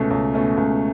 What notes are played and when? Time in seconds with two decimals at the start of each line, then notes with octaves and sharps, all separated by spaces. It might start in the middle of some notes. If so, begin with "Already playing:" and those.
Already playing: C#2 B2 A3 C#4
0.10 C#2
0.34 B2 A3 C#4
0.57 C#2